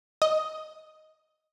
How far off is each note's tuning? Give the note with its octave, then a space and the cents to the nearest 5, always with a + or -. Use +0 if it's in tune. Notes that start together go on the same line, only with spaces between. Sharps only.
D#5 +5